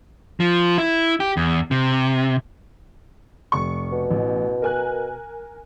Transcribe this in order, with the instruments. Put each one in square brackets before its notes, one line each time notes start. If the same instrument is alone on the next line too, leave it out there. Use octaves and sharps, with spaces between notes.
[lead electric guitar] F3
E4
G4
E2
C3
[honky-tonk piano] F1 C#6
[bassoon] B2
[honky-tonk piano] A1
A#4 G#5 F#6